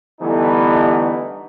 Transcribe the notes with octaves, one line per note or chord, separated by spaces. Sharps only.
D3 E3 G3 A3 B3 D#4